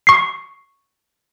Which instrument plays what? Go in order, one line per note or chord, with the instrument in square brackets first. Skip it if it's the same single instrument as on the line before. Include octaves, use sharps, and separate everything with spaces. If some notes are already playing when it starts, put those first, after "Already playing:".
[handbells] C#6 C7